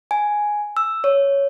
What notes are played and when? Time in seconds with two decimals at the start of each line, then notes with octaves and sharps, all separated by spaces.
0.11 G#5
0.77 E6
1.04 C#5